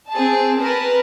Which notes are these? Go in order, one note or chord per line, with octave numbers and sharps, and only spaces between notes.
C4 G#4 A5
A#4 B4 A5